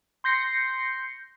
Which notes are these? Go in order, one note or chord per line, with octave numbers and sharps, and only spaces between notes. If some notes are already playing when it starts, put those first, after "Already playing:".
C6 G6 A#6 C7 C#7